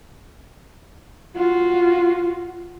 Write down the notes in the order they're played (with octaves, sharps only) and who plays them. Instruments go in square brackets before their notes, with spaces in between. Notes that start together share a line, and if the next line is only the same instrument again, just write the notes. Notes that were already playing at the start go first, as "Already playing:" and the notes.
[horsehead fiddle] F4 F#4